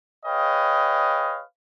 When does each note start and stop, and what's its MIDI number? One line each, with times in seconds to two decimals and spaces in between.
0.24 1.42 68
0.24 1.42 71
0.24 1.42 73
0.24 1.42 75
0.24 1.42 77
0.24 1.42 79